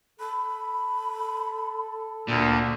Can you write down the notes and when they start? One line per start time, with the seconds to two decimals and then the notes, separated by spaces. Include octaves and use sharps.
0.20 A4 B5
2.28 D2 A#2